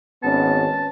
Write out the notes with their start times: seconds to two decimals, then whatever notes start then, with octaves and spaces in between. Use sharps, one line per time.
0.23 G#1 B3 C#4 A5